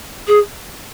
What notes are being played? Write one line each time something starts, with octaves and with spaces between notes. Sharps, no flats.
G#4